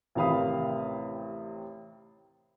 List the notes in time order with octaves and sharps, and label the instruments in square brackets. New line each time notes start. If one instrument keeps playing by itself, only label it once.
[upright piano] A1 C3 D#3 F5 B5 D#6